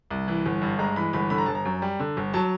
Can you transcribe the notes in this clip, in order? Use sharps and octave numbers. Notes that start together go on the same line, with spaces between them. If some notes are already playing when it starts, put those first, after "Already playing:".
C2
E3
G1
G2
G#3 A#5
E3 B5
G1 B5
D3 B5
A#5
G1 A5
A#5
F#2
G3
D3
G1
F#3 A5